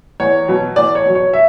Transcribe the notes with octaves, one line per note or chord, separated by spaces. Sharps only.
E2 C#5
B2 F#3
E2 D5
C#5
B2 F#3
C#5
E5